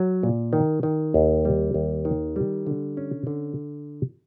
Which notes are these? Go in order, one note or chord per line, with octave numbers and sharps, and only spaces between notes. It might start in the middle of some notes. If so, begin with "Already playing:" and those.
Already playing: F#3
A#2
D#3
D#3
D#2
G3
D#2
D#3
G3
D3
C#4
D3